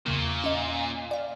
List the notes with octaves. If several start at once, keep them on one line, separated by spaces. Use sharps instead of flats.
E2 A#2 C#3 A#3
A#3 C#4 D#5
D5 F5